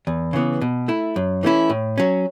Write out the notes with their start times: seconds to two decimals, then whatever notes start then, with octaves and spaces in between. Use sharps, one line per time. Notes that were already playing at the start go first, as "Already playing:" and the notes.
0.07 E2
0.33 C#3 E3 B3
0.61 B2
0.88 A3 E4
1.16 F#2
1.43 E3 A3 C#4 E4
1.70 A2
1.98 F#3 C#4